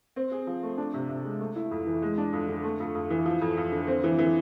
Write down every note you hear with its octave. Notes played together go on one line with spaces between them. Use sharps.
C4
G#4
F3
A3
D4
C3
C3
G#3
A3
E4
F2
E3
G#3
D4
F2
D3
A3
F2
F2
E3
F3
F2
F2
D3
C4
E3
E3